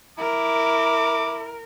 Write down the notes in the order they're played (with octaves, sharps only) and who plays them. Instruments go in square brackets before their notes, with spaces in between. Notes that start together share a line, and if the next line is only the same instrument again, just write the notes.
[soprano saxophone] E4 [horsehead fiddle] A#4 [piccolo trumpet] D6